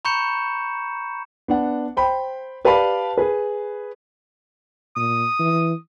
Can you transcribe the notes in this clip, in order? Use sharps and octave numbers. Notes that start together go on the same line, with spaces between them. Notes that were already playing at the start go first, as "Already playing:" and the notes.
A#5 B5 C#6 G6 C#7 E7
B3 D4 F#5
C5 G5 B5
G4 B4 D5 F5 A5 B5
G#4 B4
A#2 D#6
E3